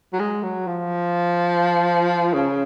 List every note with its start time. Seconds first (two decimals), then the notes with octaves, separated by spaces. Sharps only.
0.13 F#3
0.19 G#3
0.43 F#3
0.67 F3
2.34 C#3